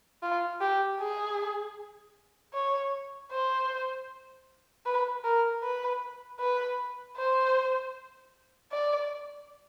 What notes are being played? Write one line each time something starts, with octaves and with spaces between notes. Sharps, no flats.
F4
G4
G#4
C#5
C5
B4
A#4
B4
B4
C5
D5